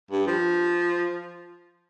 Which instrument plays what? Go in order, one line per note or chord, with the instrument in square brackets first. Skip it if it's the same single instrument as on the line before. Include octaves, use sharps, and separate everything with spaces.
[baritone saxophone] G2
F3